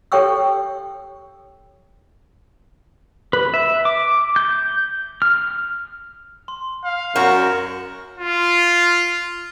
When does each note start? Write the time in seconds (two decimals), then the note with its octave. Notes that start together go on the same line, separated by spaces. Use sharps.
0.12 G4 A4 C#5 G5 C#6 E6
3.33 B4
3.54 E5
3.85 D6
4.36 G6
5.22 F6
6.48 C6
6.84 F5
7.16 F#2 F#4 A#4 F6 G6 E7
8.18 F4